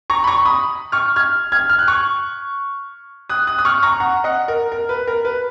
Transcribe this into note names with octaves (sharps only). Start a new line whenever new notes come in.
A#5 C#6
B5
A#5 C#6
B5 D#6
C#6 F6
F6 G#6
F6 G#6
F6
F#6
C#6 F6
D#6 F#6
D#6 F#6
D#6
C#6 F6
A#5 C#6
F#5 A#5
D#5 F#5
A#4
A#4
B4
A#4
B4